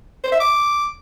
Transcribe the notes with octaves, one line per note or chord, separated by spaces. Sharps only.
C5
E5
D6